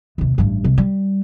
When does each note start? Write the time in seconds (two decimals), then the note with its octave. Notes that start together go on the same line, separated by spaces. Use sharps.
0.18 D#2 C3
0.38 A1 G2
0.64 C2
0.78 G3